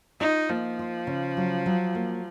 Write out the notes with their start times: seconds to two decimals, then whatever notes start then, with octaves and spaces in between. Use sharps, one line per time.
0.21 D#4 F4
0.50 F3 A#3
0.79 F4
1.07 C#3
1.37 F#3
1.66 F#3
1.95 A#3